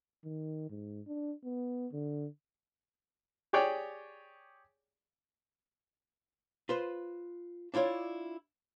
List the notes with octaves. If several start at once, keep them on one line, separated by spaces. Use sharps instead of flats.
D#3
G#2
D4
B3
D3
G4 G#4 C#5 D5 G5
F4 B4 C5
D4 E4 F4 C#5 D5